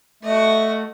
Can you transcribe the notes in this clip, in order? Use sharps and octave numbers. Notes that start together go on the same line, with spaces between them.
A3 F#4 D#5